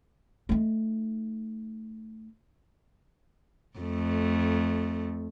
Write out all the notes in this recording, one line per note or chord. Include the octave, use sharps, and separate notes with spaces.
A3 D#4
F2 A3